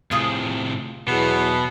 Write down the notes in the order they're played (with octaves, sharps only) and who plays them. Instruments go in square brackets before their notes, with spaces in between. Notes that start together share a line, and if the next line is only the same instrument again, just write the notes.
[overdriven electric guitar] A2 C3 [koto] F4 G#4
[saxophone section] E2 F#3 [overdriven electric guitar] B2 [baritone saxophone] B3